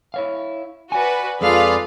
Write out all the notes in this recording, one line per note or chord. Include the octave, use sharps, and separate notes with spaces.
E4 C#5 F5
F#4 B4 D5 G#5
F2 G#3 F4 G#4 A4 B4 D5 F5